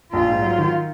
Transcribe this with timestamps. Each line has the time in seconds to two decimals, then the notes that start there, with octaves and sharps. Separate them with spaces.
0.13 A#1 F4
0.28 G#2
0.42 F#3
0.58 D#3